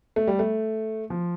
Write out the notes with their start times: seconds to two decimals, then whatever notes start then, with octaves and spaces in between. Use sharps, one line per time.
0.16 A3
0.27 G3
0.39 A3
1.10 F3